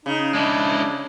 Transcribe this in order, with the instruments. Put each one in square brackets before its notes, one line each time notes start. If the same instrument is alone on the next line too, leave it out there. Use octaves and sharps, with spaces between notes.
[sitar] C#3 [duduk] D#4
[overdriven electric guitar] G#3 E4 [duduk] D4